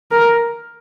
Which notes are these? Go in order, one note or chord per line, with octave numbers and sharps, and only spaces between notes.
A#4